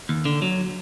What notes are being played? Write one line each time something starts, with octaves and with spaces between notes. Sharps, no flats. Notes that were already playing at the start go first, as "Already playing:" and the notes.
D#2
D3
F#3